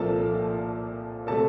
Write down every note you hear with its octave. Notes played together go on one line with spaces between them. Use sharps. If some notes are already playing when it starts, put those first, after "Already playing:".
Already playing: C2 A#2 F3 A#3 A4 A5
C3 F#3 A3 A4 A5